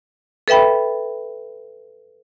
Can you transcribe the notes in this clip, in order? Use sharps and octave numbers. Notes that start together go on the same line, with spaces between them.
A4 B4 E5 G5 B5